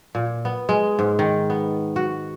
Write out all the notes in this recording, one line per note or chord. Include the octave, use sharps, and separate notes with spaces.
A#2
B3
G#3
G#2
D#3
B3
F#4